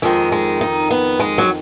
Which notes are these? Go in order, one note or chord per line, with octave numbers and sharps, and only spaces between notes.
F2 D#3 G#3
G#3
D#4
B3
G#3
F#3